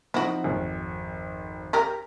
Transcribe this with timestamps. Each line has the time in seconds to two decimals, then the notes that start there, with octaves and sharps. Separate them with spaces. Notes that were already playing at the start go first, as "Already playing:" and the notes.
0.14 F3 C4 D#4 E4 F#4
0.44 G#1 F2
1.73 G4 A#4